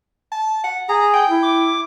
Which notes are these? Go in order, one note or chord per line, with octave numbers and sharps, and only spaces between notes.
A5
F#5
G#4 A#5
G5
E4
D6